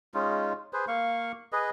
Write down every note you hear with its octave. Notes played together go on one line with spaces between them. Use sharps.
G#3 C#4 D#4 F4
G#4 B4 C5
A#3 F5 C#6
G#4 B4 D#5